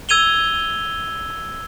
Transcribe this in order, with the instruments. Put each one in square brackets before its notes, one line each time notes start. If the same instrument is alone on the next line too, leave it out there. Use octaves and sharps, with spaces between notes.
[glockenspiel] E6 G#6 D#7 F7 G7